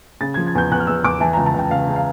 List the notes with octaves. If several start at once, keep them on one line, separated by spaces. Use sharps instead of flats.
C#3 A6
F3 G#6
G#6
E2 G6
E2 F#6
F6
E2 E6
E2 D6
E3 A5
C#2 A#5
A5
C#2 G5
C#2 F5
C#3
F5